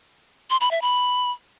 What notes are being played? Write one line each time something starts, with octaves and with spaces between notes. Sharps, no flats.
C6
B5
E5
B5